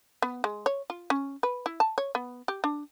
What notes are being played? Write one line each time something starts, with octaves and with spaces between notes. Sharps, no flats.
B3
G#3
C#5
F4
C#4
B4
E4
A5
C#5
B3
G4
D4